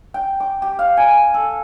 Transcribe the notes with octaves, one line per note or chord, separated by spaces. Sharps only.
G5
D6
G4
F5
G#5
A4